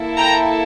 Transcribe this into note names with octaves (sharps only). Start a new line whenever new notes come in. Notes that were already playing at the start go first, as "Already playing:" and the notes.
Already playing: A#3 E4 A4
G5 A#5